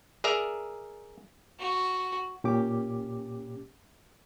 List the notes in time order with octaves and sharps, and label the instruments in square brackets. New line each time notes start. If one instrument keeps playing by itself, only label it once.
[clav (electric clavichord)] G#4 A#4 D5 E5 A#5
[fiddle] F#4
[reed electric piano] A#2 C#4 G4 D6